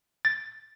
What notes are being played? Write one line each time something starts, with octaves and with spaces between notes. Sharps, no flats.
A6